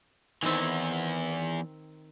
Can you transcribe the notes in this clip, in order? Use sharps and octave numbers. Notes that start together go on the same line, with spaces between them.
E2 D#3 E3 C4